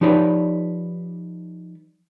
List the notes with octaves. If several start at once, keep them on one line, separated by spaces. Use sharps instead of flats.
F3 D#4 G4 B4 C#5 D5